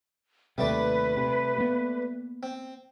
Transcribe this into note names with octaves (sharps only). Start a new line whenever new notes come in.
D#2 C3 G3 A3 B4 D5
C3
A#3 B3
C4